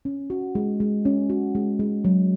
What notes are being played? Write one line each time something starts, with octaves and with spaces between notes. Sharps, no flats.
C#4
F#4
G#3
G#3
C#4
F#4
G#3
G#3
F#3